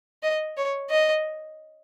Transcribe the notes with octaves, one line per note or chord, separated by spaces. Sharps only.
D#5
C#5
D#5